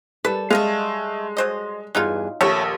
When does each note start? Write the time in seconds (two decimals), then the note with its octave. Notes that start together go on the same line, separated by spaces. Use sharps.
0.25 G3 A4 B4
0.50 G#3 A3 D#5 F5
1.37 F#3 C5 D#5
1.95 E2 G2 F#3 D#4 F4 G#4
2.41 A#1 D#2 A3 G4 A4 C#5